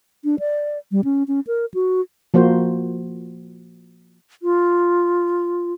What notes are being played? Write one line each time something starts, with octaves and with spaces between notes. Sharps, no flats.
D4
D5
G3
C#4
C#4
A#4
F#4
F3 A#3 F#4 C5
F4